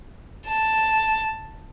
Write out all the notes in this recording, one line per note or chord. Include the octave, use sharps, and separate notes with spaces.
A5